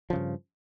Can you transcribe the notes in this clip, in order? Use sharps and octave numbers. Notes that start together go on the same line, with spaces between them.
G2 C#3 F3